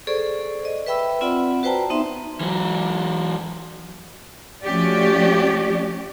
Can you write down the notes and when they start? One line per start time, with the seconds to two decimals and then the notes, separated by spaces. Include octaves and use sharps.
0.07 G#4 A4 C5 D5 C#6
0.65 D#5
0.86 B4 E5 G5 B5 E6
1.21 C4 F4 D5 F#5 B5
1.63 F#4 B4 C5 G5 A5 A#5
1.90 B3 D#4 E5 C6
2.41 E3 F#3
4.63 F3 A3 C#4 F#4 G4 D5